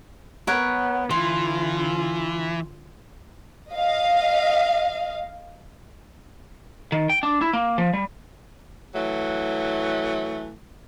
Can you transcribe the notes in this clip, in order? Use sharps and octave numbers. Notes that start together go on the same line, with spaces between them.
B3 A#4 C#5 F#5
D3 E3 F4 C6
D#5 F5
D#3
G5
D4
E4
A#3
F3
G3
E3 F#3 A3